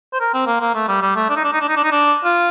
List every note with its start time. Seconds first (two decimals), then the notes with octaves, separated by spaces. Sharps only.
0.13 C5
0.20 A#4
0.34 C4
0.47 A#3
0.61 A#3
0.75 A3
0.88 G3
1.02 G3
1.16 A3
1.29 D4
1.37 D#4
1.44 D4
1.53 D#4
1.61 D4
1.69 D#4
1.76 D4
1.84 D#4
1.92 D4
2.24 F4